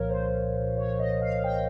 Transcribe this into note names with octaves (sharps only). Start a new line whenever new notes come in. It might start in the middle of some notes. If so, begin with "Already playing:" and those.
Already playing: C2 A#2 F3 A#4 C#5 F5
C5
C#5
D#5
F5
G5